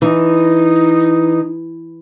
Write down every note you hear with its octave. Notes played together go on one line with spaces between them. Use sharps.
E3 D#4